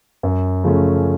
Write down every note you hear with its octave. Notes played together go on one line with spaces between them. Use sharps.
F#2
C#3 F3 A3 C#4